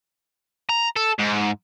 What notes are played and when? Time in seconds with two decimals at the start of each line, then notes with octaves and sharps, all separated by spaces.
0.69 A#5
0.96 A4
1.19 G#2